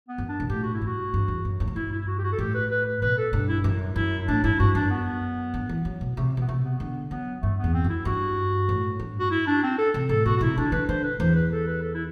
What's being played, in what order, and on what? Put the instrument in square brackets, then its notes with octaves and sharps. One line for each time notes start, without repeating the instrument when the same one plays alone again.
[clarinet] B3
[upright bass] F#2
[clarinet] D4
[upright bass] B2
[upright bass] A2 [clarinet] G4
[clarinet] F#4
E4
[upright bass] G2 [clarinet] F#4
[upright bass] G2
E2
F#2
G2
A2
[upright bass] G2 [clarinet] E4
[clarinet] E4
F#4
G4
F#4
A4
[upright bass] A2 [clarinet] G4
[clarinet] B4
B4
B4
[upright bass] B2 [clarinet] B4
[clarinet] A4
[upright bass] G2
[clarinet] E4
[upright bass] F#2
[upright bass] F#2 [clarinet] E4
[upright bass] A2 [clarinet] D4
[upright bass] G2 [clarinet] E4
[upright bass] G2 [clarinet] F#4
[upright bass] F#2 [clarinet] D4
[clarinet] B3
[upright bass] G2
E3
F#3
B2
[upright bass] C3 [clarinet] A3
[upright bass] B2 [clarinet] B3
[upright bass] C3 [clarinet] A3
[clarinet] B3
[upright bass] D3 [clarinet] B3
[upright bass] F#3 [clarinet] B3
[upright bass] G2 [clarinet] A3
[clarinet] B3
[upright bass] E2
[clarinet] C4
[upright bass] F#2
[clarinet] E4
[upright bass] G2 [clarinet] F#4
[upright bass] A2
G2
[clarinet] F#4
E4
D4
C4
A4
[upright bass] C3
[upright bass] A2 [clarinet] A4
[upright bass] B2 [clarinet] F#4
[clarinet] F#4
[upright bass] C3 [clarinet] E4
[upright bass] D3 [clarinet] D4
[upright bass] D3 [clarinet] B4
[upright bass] D3 [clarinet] C5
[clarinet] B4
[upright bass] E2 [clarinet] C5
[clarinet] B4
A4
B4
A4
E4